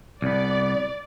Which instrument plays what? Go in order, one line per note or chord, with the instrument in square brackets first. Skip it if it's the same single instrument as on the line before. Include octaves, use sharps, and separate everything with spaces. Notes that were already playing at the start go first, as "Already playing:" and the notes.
[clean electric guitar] C2 B3 [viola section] D5